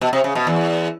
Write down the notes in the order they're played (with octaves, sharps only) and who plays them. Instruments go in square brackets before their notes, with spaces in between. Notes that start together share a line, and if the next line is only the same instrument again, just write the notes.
[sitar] B2
C3
C#3
B2
E2